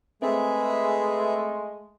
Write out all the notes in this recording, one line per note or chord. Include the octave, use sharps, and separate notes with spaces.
G#3 A3 C4 G#4 B4 E5